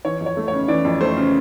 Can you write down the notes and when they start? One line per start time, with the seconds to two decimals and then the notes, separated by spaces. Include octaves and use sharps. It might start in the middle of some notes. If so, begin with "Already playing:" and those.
0.05 E3 C#5
0.21 F2
0.26 C#5
0.37 A3
0.48 C#5
0.53 C#3
0.68 E3 D5
0.85 F2
1.01 A3 C5
1.17 C#3